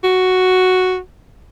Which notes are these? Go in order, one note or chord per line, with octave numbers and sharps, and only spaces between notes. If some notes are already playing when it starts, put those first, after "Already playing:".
F#4